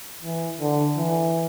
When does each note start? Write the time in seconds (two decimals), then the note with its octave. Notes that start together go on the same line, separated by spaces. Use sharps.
0.23 E3
0.60 D3
0.98 E3